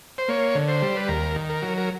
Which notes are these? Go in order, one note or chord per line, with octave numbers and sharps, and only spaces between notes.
C5
A#3 C#5
D3
C5
G3
B4
D#2 A#4
D#3
A#4
F#3
A#4